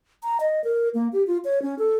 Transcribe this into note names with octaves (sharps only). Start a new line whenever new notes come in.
A#5
D#5
A#4
A#3
G4
F4
C#5
C#4
A4